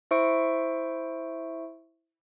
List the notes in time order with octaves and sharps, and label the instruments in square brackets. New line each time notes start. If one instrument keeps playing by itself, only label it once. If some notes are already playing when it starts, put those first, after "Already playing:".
[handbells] E4 C5 E5 C#6 D7